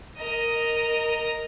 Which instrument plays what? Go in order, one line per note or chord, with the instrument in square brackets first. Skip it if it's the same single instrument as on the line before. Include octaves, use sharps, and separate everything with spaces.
[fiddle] A#4 D#5